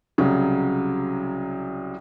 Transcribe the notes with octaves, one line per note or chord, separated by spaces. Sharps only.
C2 C#3 F#3